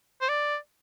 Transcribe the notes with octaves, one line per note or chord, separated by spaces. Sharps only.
C5
D5